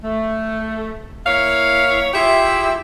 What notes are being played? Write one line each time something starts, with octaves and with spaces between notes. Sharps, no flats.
A3
A#3 E4 C#5 F5
E4 F4 G4 G#4 E5